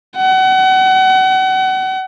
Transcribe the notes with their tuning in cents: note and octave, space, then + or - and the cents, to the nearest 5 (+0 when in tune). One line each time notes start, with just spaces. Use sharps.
F#5 +35